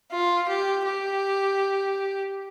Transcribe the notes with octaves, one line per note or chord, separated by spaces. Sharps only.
F4
G4
G4